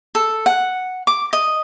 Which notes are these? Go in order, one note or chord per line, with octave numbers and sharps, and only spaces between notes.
A4
F#5
D6
D#5